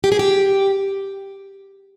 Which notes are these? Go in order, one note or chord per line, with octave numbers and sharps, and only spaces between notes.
G4
G#4
G4